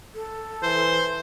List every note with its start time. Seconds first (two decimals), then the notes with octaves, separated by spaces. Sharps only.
0.14 A4
0.63 E3 C5